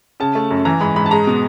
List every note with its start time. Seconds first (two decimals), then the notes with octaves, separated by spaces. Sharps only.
0.20 C#3 A5
0.35 A3
0.51 F#2
0.65 E3 A#5
0.81 G#2 B5
0.96 G#2 B5
1.06 A5
1.11 G#3 A#5
1.27 B2